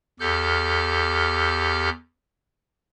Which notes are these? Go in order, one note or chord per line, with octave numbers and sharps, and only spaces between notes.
E2 G4 A4 F6 G6